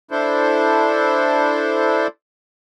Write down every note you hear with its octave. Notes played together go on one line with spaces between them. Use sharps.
D4 E4 A4 C5